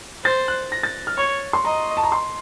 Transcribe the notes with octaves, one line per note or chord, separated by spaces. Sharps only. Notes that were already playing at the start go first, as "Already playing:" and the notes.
C5 A6
F#6
A#6
A6
F6
C#5 C#6
C6
D#5 A#5
A5
A#5
C6